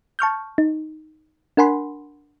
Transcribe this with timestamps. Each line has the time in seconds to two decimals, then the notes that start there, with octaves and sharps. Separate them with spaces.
0.19 A5 C#6 F6 G6
0.58 D#4
1.57 D4 A#4 F#5 G#5 B5 C6